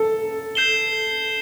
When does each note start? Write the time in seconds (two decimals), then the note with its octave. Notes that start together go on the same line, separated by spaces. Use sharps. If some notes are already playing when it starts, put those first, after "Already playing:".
Already playing: A4
0.55 G6 C7 E7 G7